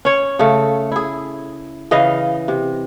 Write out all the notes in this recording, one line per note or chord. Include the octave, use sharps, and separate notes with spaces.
C#4 C#5
C#3 A3
E4 G#4
C#3 E3 D#5 F5
C3